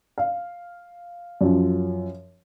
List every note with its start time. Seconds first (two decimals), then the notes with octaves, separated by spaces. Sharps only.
0.18 F5
1.41 F#2 F3